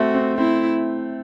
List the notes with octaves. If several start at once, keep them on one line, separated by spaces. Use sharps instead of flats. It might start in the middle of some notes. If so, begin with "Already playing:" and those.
Already playing: A3 C4 F#4
C4
C4 E4